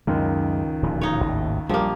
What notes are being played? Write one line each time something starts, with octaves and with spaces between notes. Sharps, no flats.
C#2 F#2 D#3 G#3
D1 A#2 F3
D#4 C#5
G#1 D#2 A2
A#1 F3 G3 A#3 G4